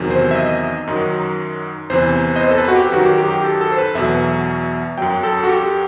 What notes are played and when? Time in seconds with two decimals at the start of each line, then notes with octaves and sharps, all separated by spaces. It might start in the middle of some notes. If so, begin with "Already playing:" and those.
Already playing: E2 C3 D#3 F#3
0.10 C5
0.31 E5
0.35 D#5
0.87 F#2 D#3 F#3
1.90 E2 C3 E3 C5
2.36 D#5
2.41 C5
2.51 A4
2.58 B4
2.68 F#4
2.76 G4
2.92 F#2 D#3 F#3 F#4
3.05 G4
3.18 G4
3.31 G4
3.44 A4
3.61 A4
3.72 C5
3.78 B4
3.95 E2 B2 F#3 E5
4.98 F#2 F#3 G5
5.23 A4
5.44 F#4
5.49 G4